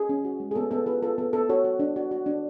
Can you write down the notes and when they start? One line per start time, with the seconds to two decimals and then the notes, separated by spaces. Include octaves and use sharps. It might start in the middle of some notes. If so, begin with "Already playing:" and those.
Already playing: G#4
0.09 C#4
0.25 F#4
0.40 G#3
0.51 G#4
0.55 B3 A4
0.71 B3 A4
0.86 F4 G#4 B4
1.03 F4 A4
1.18 B3 A4
1.33 B3 A4
1.49 F#4 A4 C#5
1.64 F#4
1.79 D4
1.96 F#4
2.11 F#4
2.26 D4